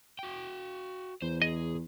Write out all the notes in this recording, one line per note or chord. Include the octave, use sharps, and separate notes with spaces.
F#4 G5
E2 C5
G#4 D#5